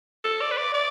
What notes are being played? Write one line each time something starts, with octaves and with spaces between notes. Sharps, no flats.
A4
D5
B4
D5
D5